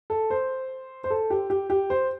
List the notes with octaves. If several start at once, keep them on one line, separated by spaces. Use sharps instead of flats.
A4
C5
C5
A4
G4
G4
G4
C5